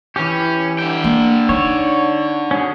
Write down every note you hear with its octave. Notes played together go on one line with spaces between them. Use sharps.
E3 C#4 G4
D3 G5
A#3
D#4 C#5
C#4 F#4 G#4